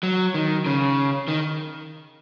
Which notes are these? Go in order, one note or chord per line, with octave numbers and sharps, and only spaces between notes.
F#3
D#3
C#3
D#3